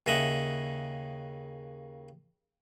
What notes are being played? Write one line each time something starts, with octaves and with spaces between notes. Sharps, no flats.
D#2 C#3 D#5 E5 F#5